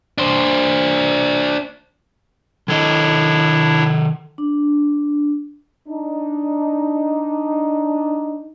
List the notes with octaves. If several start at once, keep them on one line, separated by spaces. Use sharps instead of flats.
D4 C5
D#3 D4 E4 A4 C#5 D#5
D4
D4 D#4